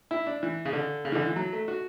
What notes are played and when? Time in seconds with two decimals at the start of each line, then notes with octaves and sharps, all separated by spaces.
0.11 E4
0.27 D4
0.43 E3
0.65 C#3
0.73 D3
1.05 C#3
1.12 E3
1.15 D3
1.26 E3
1.36 F#3
1.53 A3
1.68 F#4